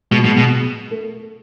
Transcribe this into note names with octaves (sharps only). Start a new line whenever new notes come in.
B2 G#3
F#3
B2 G#3
B2
A3